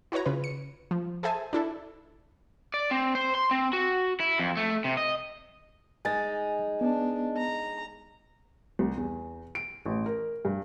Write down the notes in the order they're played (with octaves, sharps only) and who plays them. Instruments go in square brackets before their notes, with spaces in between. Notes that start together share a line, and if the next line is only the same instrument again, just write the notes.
[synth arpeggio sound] E4 F#4 B4 C#5 A#5
C#3 F4 B4
C#7
F3
G#4 A4 C5 E5 G#5 A5
D4 E4 A4
[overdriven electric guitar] D5
C4
C5
C6
C4
F#4
E4
F2
A3
C3
D#5
[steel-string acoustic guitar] G#3 D#4 [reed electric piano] G#5 A6
[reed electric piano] B3 [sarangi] D4
[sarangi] A#5
[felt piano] C2
E2
D7
A1
A#4
G2